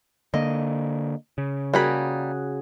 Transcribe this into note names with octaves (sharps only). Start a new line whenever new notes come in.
D3 A#3 D#5
C#3
G3 A#3 F#4 G#4 B5